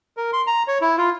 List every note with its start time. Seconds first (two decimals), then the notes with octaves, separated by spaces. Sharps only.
0.17 A#4
0.33 C6
0.47 A#5
0.68 C#5
0.81 E4
0.98 F4